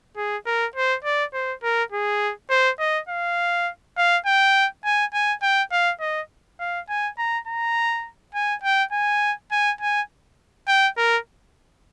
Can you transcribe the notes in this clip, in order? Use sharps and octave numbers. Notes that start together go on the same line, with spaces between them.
G#4
A#4
C5
D5
C5
A#4
G#4
C5
D#5
F5
F5
G5
G#5
G#5
G5
F5
D#5
F5
G#5
A#5
A#5
G#5
G5
G#5
G#5
G#5
G5
A#4